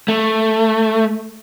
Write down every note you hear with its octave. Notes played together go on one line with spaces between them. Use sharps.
A3